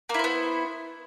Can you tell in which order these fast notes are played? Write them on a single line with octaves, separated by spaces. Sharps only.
A#3 E4 C5 B3